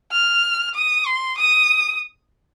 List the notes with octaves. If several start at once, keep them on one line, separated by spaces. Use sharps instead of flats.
F6
D#6
C6
D#6